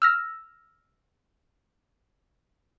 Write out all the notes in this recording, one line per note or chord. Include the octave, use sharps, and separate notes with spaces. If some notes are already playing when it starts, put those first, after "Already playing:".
E6 F6 A#6